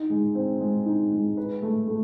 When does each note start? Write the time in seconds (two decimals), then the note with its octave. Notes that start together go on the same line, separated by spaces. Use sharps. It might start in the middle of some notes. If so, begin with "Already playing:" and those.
Already playing: D#4
0.10 G#3
0.35 C4
0.61 G#3
0.86 D#4
1.12 G#3
1.37 B4
1.62 A3
1.88 A3